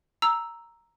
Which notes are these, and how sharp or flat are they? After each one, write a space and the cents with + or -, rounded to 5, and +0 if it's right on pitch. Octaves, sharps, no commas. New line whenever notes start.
A#5 +0 E6 +0